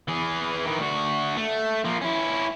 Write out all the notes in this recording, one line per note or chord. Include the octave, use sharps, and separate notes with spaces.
E3 G#4
D#3 E3
D2 F#4
A3
F3 A#3
C#4 E4